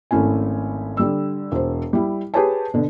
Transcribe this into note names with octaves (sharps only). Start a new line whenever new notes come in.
G#1 A3 C#4 E4 G#5
D3 G3 E6
E1 C5
G3 E4
G4 G#4 B4 C#5 G#5 A5
B2 D3